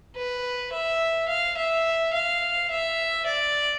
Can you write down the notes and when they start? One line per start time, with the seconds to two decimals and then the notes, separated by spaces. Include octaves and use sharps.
0.16 B4
0.72 E5
1.28 F5
1.57 E5
2.13 F5
2.70 E5
3.26 D5